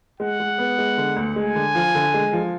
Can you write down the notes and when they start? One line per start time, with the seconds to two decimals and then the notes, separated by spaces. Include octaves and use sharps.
0.20 G#3 F#5
0.40 G#3
0.58 B3
0.78 G#3
0.97 D3
1.16 D2
1.36 G#3 G#5
1.55 D3
1.75 F3
1.95 D3
2.14 G#3
2.33 F3